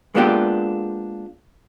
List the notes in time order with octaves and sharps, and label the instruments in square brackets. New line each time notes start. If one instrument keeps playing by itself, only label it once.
[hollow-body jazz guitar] G#3 A#3 B3 D4 F4 G4